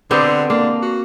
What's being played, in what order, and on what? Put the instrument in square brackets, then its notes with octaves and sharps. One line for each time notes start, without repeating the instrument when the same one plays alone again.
[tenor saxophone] D3 [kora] B3 C4 G4
[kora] A#3 [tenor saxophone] D4
[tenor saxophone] F#4